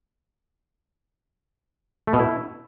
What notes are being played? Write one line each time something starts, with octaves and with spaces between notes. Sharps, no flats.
A3
B2
E4